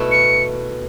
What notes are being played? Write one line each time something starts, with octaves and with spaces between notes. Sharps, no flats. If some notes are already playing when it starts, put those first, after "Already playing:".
Already playing: B2 A3 E4 B4
C#7